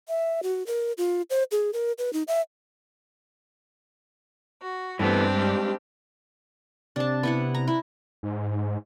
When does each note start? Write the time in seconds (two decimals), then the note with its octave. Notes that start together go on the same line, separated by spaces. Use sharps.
0.08 E5
0.43 F#4
0.67 A#4
0.98 F4
1.30 C5
1.51 G#4
1.73 A#4
1.98 B4
2.13 D#4
2.28 E5
4.62 F#4
4.99 G2 E3 A3 B3 C4 D4 G4
5.34 G#2 G3
6.96 C3 D4 A5
7.23 B3 E4 F#5
7.55 A#5
7.68 E4
8.23 G#2